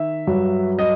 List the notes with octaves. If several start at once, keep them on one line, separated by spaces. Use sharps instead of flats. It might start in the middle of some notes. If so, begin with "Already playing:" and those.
Already playing: D#3 E5
G2 F#3
D#5